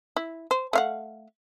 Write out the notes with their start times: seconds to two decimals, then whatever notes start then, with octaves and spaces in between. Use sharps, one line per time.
0.17 E4
0.51 C5
0.73 A3 F5 F#5